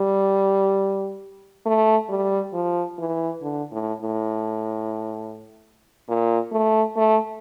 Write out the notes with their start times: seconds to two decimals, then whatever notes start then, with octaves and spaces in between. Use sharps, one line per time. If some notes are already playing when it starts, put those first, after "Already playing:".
Already playing: G3
1.66 A3
2.09 G3
2.53 F3
2.99 E3
3.42 D3
3.72 A2
4.01 A2
6.08 A#2
6.52 A3
6.96 A3